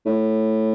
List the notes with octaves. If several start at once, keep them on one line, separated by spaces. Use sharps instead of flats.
A2